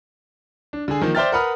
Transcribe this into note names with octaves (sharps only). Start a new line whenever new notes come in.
D4
D3 G#4
D#3 F3 A#3
C5 D5 E5 G5 F6 A6
A#4 B4 F#5 B5 D#6 F6